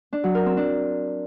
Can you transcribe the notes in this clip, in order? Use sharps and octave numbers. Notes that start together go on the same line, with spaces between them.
D4
F#3
A#4
C4
D4